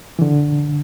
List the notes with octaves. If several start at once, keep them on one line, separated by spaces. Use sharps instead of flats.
E3
D3